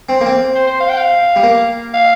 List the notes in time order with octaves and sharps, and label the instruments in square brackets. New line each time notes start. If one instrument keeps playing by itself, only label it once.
[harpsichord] C4
A#3
C4
[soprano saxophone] C5
C5
F5
G5
F5
[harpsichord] G3
A#3
[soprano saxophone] F5